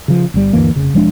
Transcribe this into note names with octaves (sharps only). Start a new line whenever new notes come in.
C#3 F3
G1 G3
D2 G2 E3 A#3
F1 C#3
E1 F3 G#3 D4